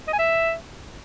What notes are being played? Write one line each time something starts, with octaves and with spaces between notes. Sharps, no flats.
D#5
G#5
E5